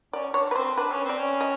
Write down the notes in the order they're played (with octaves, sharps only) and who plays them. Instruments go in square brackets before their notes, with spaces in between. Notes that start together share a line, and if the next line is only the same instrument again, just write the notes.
[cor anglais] C#4 [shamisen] D5
[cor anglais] D4 [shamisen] C#5
[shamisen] B4
[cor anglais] C4 [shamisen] C5
[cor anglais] D4 [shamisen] B4
[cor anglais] C#4
[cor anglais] C4 [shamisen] D5
[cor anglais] C#4
[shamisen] D#5